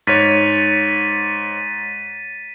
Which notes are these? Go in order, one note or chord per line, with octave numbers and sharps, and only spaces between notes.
G#2 C#5 A6 B6 D#7